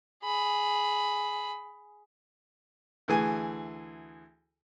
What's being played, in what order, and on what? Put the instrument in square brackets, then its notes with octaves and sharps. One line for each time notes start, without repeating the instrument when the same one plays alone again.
[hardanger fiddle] G#4 B5
[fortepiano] D2 E3 G#4 G#5